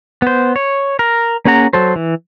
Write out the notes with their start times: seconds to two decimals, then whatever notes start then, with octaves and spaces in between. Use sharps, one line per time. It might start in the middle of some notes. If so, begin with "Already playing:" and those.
0.22 B3 C5
0.56 C#5
0.99 A#4
1.45 A#3 C#4 G#4 F#5 A#5
1.73 F#3 A4 C5
1.96 E3